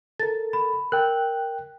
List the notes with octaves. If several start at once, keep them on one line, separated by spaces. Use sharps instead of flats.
A4 A#4 A6
B5
A#4 G5 F#6